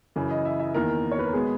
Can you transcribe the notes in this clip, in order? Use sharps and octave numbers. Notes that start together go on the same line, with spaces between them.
F#2 C#3 E3
D#5
E5
E5
E2 D#3 A#3 A#4
C#5
B4
A#4
B2 G#3 B3 G#4